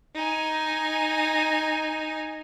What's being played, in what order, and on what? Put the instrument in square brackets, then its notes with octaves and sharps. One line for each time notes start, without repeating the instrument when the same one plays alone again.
[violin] D#4 G#5